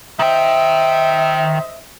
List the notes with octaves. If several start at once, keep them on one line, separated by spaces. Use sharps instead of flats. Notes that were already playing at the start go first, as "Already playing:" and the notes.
D#3 C5 D#5 E5 G5